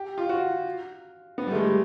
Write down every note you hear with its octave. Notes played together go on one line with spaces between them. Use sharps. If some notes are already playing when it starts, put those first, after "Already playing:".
Already playing: G4
F4
F#4
B3
G3
A3
G#3
G3